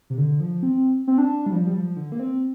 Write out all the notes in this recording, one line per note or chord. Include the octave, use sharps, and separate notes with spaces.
C3
D3
F3
C4
C4
D4
G3
F3
G3
F3
D3
A#3
C4